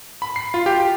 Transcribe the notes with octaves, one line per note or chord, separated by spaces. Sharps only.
B5
C7
F4
G4
G4